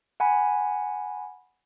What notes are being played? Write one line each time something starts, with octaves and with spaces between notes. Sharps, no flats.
F#5 G#5 B5